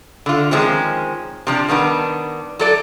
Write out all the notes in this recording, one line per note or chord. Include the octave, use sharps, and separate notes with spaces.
D3 F4
D#3 F3 G#3 C4 C#4
C3 F3 D4
D#3 G3 B3 D4
F#3 A4 D5